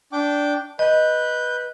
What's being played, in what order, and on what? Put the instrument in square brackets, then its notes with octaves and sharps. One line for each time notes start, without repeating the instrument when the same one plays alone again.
[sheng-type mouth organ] D4 G5 D6
[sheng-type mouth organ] B4 G6 [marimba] D#5